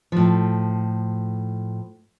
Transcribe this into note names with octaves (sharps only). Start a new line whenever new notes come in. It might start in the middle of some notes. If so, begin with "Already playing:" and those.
A2 F3